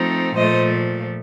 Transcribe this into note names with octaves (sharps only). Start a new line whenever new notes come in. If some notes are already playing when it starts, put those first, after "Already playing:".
Already playing: F3 A3 C4 D#4
A#2 F3 A3 C5 D#5